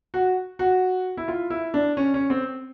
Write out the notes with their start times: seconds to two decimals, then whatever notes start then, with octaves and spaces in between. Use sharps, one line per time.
0.14 F#4
0.59 F#4
1.17 E4
1.28 F4
1.50 E4
1.74 D4
1.97 C#4
2.14 C#4
2.30 C4